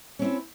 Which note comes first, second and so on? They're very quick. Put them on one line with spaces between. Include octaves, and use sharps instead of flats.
C#4 C4 E4